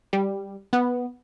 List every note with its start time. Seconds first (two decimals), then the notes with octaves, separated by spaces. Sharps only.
0.13 G3
0.73 B3